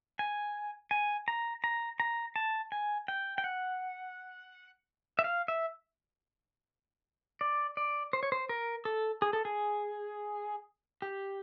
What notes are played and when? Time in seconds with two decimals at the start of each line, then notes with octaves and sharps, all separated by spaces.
0.19 G#5
0.91 G#5
1.28 A#5
1.64 A#5
2.00 A#5
2.36 A5
2.72 G#5
3.08 G5
3.38 G5
3.44 F#5
5.19 E5
5.24 F5
5.48 E5
7.41 D5
7.77 D5
8.13 C5
8.23 C#5
8.32 C5
8.49 A#4
8.85 A4
9.22 G#4
9.33 A4
9.45 G#4
11.02 G4